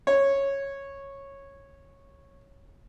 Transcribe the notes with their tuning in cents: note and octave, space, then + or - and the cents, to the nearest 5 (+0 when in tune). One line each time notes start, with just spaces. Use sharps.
C#5 -10